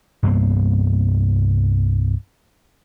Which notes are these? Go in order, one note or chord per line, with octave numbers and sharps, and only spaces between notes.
C2 G2 A#3 B3